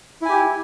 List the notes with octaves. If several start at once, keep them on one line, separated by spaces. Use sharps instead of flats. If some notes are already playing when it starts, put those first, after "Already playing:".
E4 G4 G#5